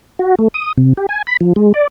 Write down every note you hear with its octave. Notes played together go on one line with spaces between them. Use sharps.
F#4
A3
D#6
C3
G4
G#5
B5
F3
G#3
D5